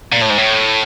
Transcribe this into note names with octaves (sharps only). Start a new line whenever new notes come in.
A#2
A2
G#2
A2